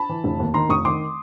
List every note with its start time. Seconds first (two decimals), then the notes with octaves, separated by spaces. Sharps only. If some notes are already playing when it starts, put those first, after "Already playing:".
Already playing: A5 B5
0.09 E3
0.24 F1
0.40 D#2
0.54 D#3 A#5 C6
0.69 F1 C#6 D#6
0.85 D#3 C6 D6